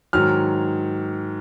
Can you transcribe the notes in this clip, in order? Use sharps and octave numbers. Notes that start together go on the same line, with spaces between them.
G#2 D#3 F#3 F6